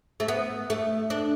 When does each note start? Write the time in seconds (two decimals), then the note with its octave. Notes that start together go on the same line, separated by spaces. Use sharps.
0.20 A3
0.28 B3
0.70 A3
1.10 D4